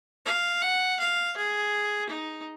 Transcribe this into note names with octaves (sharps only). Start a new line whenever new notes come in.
F5
F#5
F5
G#4
D#4